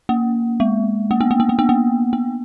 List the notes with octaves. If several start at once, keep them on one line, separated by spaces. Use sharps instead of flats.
A#3
G#3
A#3
B3
A#3
B3
A#3
B3
A#3
B3